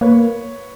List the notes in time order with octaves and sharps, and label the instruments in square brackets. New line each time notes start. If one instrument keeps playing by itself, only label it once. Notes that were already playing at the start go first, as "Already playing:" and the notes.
[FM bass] A#3 [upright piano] B4 C#5